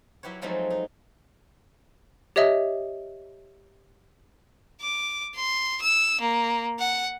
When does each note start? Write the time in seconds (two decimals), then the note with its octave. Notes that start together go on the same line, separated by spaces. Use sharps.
0.23 F#3 E4 G4 B4 C#5
0.42 F3 F#3 G#3 A3 C4 D#4
0.70 D#4
2.36 G4 C#5 D#5 E5 D#6
4.82 D6
5.35 C6
5.82 E6
6.21 A#3
6.79 F#5